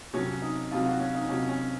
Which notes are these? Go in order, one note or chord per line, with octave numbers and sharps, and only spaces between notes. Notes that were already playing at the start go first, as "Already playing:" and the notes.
F2 C3 F#3 C#4
D#4
F2 C3 F#3 F4
F#4
C#4
D#4
F2 C3 F#3 C#4
C#4